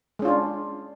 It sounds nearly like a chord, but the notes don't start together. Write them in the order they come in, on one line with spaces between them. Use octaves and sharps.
G#3 C#4 F4 D4